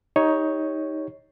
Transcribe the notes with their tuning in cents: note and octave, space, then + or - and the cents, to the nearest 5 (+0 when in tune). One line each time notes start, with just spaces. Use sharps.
D#4 +15 G4 +10 C#5 +0